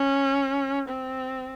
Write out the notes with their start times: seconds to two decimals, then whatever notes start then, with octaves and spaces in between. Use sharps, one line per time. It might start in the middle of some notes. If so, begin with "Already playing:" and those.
Already playing: C#4
0.89 C4